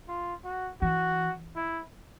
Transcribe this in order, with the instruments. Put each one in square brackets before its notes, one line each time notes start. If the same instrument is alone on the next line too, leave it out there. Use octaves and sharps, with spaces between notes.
[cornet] F4
F#4
[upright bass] E3 [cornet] F#4
[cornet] E4